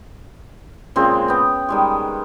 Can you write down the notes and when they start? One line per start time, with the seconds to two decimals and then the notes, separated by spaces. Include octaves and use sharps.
0.96 A#2 C#3 G#3 C4
1.28 B3 G5
1.69 D#3 G3 G#3